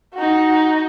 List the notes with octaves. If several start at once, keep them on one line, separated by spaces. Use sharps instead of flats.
D#4 F#4